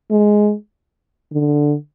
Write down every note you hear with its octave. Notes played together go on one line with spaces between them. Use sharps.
G#3
D3